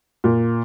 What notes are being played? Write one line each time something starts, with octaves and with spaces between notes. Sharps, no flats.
A#2